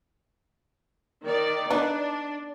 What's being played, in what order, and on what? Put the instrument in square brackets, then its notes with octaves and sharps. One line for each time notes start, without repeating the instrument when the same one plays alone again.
[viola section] D#3 D5
[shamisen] B3 D#4 [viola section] D4 [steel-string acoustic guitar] D5